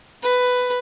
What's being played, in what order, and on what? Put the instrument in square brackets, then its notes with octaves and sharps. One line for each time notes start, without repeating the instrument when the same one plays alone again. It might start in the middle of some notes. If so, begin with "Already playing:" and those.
[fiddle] B4